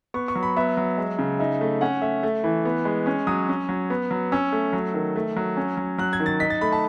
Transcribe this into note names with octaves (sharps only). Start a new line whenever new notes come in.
B3 C#6
C#6
F#3
B5
B3 E5
F#3
G#3
C#3
D#4 E5
A3
C#4 F#5
A3 E5
A3
E3
B3
G#3
C#4 C#6
F#3 D#6
C#4
F#3
B3
F#3
C#4 E6
A3
F#3
D#3
A3
F#3
C#4
F#3
F#3 F#6
G#6
D#3
A6
D#4 B6
A6
A3 B5
A5